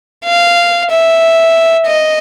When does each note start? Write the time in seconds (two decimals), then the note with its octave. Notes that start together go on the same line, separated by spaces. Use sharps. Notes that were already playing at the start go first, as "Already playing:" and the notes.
0.25 F5
0.90 E5
1.87 D#5